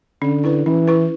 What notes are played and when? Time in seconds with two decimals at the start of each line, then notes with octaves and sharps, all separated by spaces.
0.22 D3 C#4
0.44 E4 B4
0.66 E3 C#4
0.87 E4 B4